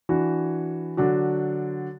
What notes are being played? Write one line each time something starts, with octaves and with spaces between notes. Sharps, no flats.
E3 D4 F#4
D3 F#3 D4 F#4